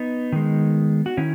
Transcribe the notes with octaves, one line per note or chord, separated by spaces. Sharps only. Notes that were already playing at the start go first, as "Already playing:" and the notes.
Already playing: B3 D#4
D#3 G#3
F#4
D#3 C#4 E4